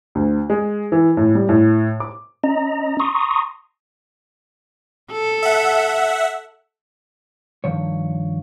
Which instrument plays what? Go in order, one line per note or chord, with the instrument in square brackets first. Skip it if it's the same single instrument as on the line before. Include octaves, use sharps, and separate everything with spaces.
[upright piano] D2
G#3
E3
A2
G3
A2
D6
[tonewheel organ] C#4 D#5 A#5
A#5 C6 C#6 D#6
[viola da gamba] A4
[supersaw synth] E5 F#5
[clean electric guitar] G2 D#3 F3 C#5